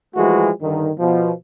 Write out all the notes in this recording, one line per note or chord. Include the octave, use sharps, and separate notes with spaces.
E3 F3 G#3 A3 F#4
G2 D3 D#3
B2 F3